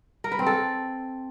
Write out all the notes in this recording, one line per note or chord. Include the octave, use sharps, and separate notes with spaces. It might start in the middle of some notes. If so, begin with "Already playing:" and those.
A#4
B4
C4
A4